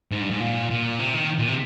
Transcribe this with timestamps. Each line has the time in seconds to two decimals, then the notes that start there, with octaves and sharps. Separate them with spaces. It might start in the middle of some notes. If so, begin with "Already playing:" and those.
0.12 G#2
0.21 G2
0.31 G#2
0.40 A#2
0.71 A#2
0.99 C3
1.14 D#3
1.39 A#2
1.48 C3